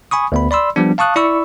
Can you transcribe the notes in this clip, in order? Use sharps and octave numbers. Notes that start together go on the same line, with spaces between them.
G#5 B5 C#6 D#6
D2 B3 B5
D5 B5 C6 E6
F3 G3 B3 D4
F5 A5 C#6 D#6 F#6
E4 D5 B5 C#6 E6